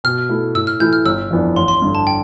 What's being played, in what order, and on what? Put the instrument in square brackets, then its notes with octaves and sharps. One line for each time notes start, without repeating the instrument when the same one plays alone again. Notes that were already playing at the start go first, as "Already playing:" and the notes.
[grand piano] B2 [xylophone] F6
[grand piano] A3 E4
[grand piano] A2 [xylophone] E6
[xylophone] F6
[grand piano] E3 A3 E4 [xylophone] G6
[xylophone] F6
[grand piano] G1 [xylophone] E6
[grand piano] F2 E3 B3 D4
[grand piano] A1 [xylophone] C6
[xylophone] C6
[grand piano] G2 D3
[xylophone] A5
G5